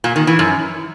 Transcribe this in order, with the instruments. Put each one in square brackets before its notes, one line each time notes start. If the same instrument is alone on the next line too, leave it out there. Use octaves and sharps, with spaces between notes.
[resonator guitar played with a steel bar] A#2
D#3
E3
F#2